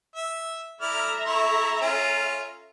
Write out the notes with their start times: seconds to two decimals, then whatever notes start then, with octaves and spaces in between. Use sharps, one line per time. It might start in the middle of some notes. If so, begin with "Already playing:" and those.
0.15 E5
0.81 E4 A4 D5 E5 A#5 F6
1.26 E4 C#6
1.81 C#4 F4